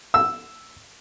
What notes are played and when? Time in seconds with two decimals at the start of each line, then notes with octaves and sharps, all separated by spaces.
0.14 E6